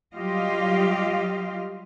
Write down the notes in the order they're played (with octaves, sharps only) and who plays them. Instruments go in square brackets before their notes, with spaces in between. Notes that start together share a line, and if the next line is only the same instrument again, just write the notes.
[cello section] F#3 G3 F4 G4 D#5 F5